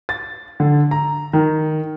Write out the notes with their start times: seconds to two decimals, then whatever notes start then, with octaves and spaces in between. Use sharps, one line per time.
0.09 A6
0.60 D3
0.91 A#5
1.33 D#3